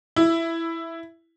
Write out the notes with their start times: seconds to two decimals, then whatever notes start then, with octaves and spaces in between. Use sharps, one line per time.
0.16 E4